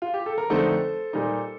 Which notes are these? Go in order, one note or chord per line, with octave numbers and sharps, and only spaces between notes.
F4
G4
A4
A#4
F2 D3 A3 C4 D#4 A4 C5
A#2 G3 A#3 D#4